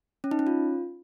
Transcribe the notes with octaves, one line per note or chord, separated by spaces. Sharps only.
C#4
D#4
C#4
F4